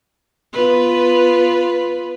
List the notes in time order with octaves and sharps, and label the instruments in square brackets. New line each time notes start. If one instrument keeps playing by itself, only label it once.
[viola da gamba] B3 F4 B4